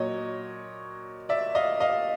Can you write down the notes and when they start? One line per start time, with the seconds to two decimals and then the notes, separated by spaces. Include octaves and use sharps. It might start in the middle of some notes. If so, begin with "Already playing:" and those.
Already playing: A#2 F#3 C#5 D#5
1.29 D5 E5
1.55 D#5 F5
1.80 D#5 F5